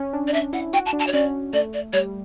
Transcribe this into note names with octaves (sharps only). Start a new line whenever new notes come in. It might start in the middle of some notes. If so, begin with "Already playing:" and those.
Already playing: C#4
D4
D5
D4 E5
E4 F#5
F#4 G5
A5
D4
A5
C#5
C#4 D5
A3 D5
D5
G3 C#5